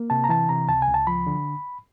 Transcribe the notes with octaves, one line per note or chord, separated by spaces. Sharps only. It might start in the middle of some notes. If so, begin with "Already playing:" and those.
Already playing: A#3
C3 A5
A#5
E3 A5
C3 A#5
C#2 A5
G#5
C#2
A5
F3 B5
D3